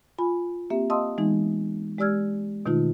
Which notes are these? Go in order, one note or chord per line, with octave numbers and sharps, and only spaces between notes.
F4 G#5 B5
A#3 C4 G4 E5
D#5 F5 A5 C6 D#6 E6
E3 G#3 B3 D#4
G#3 G4 D5 E6 F6 G#6
B2 D#3 A3 D#4 F4